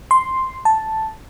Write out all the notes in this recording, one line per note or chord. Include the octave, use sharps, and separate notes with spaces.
C6
A5